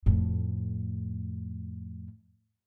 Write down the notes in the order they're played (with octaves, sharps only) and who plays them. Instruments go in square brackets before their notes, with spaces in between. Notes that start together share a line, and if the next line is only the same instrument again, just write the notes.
[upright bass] F2 A2